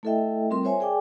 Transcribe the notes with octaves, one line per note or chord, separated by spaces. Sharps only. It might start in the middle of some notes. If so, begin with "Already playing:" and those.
A3 E4 A4 D#5 E5 G5
G3 C4 F4 A#4 C6
A#4 C5 C#5 E5 G#5
G#4 D5 G5 G#5 D6